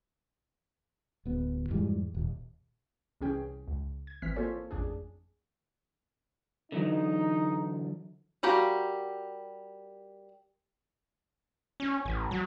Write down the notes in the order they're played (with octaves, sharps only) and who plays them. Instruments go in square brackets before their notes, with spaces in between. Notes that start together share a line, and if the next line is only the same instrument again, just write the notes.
[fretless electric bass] D1 B3
F2 G#2 E3 G3
D#1
[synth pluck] C2 E3 C#4 G#4 G5
C#2
G#6
G#1 E3 C4 F6 B6
A#3 F4 A4 C5 C#5 G#5
A1 F2 D4 G#4
[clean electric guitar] D3 E3 F#3 [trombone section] D#4
[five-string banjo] G3 F#4 G4 A#4 F5
[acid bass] C#4
A1
F#3